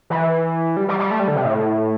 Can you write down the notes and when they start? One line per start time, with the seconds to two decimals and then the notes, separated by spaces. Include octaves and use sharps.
0.10 E3
0.77 G3
0.88 G3
0.99 G3
1.11 A3
1.20 G3
1.28 D3
1.36 C3
1.44 A2